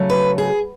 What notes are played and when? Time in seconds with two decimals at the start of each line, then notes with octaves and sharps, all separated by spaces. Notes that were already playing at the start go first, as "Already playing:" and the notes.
Already playing: C#3 F#3 A3
0.10 B4
0.38 G#4